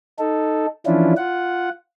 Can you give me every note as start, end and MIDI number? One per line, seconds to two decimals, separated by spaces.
0.19 0.67 63
0.19 0.67 69
0.86 1.13 52
0.86 1.13 53
0.86 1.13 61
0.86 1.13 62
0.86 1.13 64
0.86 1.13 65
1.17 1.70 65
1.17 1.70 78